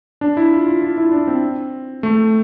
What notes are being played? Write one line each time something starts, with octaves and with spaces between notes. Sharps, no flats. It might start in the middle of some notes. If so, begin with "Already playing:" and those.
D4
E4
F4
F4
F4
E4
D4
C4
A3